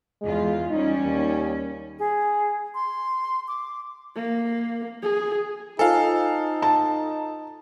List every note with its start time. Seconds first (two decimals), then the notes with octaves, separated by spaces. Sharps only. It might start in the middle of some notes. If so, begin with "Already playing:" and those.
0.21 E2 G#3 F4
0.70 G3 C#4 D#4
1.03 D#2
1.99 G#4
2.74 C6
3.48 D6
4.15 A#3
5.02 G#4
5.79 D#4 F4 A4 C5 F5 G#5
6.62 A5